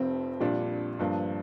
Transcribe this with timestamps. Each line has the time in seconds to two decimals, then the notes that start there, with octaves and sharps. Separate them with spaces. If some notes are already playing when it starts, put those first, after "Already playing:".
Already playing: F1 F2 C3 F3 C4
0.40 A#1 A#2 G3 D4
0.99 G1 G2 F3 A#3 D4